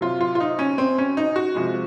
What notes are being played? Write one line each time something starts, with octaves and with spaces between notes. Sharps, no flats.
C3 F#3 F4
F4
F4
D#4
C#4
C4
C#4
D#4
F#4
C3 F3 G#3